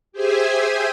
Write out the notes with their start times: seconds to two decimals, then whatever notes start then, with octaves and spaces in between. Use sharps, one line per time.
0.12 G4 G#4 C5 E5 G#5